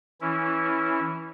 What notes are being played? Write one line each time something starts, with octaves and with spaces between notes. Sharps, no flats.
E3 C#4 E4